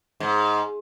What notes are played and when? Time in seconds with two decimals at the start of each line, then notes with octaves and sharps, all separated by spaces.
0.20 G#2